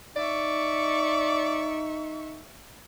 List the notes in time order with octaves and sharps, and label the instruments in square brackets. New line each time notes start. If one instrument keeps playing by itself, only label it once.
[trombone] D#4 [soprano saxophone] D5 [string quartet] E5 C#6